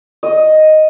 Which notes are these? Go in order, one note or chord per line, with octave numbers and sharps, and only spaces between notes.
D#5